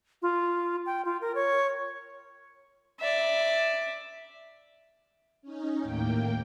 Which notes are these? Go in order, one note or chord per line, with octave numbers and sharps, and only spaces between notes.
F4
G5
F4
A#4
C#5
D5 E5
C#4 D#4
D#2 A2 A#3 G5